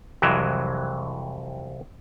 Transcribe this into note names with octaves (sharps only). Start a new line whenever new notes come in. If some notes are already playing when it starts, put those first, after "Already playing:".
C2 F2 C3 E3 F#3 G#3